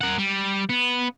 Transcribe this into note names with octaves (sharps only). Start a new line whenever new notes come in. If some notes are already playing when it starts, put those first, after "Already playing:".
A#4 F#5
G3
B3